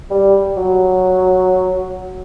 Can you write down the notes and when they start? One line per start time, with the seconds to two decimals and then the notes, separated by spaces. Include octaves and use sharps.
0.11 G3
0.57 F#3